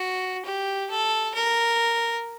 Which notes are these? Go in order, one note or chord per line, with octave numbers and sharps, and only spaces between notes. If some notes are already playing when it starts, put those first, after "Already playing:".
Already playing: F#4
G4
A4
A#4